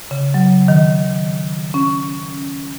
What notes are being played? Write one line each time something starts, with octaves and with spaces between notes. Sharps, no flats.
C#3
F#3
D#3
C#4